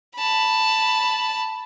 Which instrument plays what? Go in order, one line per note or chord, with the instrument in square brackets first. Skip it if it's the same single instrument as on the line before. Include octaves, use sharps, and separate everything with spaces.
[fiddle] A5 B5